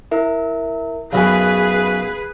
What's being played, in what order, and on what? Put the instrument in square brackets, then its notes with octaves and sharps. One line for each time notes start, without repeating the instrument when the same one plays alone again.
[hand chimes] E4 A#4 E5
[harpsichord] B1 F#2 [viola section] G#4 B4 [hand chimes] F5 G#5